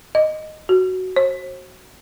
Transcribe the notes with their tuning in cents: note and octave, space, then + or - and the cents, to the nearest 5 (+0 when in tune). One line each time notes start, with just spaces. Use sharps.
D#5 -5
F#4 +5
C5 +40